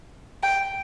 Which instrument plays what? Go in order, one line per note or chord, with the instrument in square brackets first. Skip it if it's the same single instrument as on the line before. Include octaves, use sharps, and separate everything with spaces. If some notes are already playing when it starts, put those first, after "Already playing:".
[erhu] G5